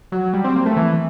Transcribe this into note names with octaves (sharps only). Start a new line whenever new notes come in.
F#3
G3
C4
A#3
A3
E3